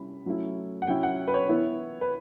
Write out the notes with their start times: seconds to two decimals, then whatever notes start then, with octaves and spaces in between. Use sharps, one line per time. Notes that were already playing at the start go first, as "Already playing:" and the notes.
Already playing: G3 C#4 E4 B5
0.26 F#3 A3 C#4 E4
0.82 F#5
0.87 F#3 C#4 E4 G5
1.03 F#5
1.28 B4
1.34 C#5
1.49 E3 B3 E4
2.01 B4